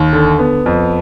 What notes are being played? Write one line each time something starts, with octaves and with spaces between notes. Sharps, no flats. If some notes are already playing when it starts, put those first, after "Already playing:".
Already playing: D#2
D3
B3
F2